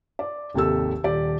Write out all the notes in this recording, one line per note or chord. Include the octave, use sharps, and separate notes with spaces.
D5
G#1 D#2 C3 G4 A4 E6
D#1 G4 D5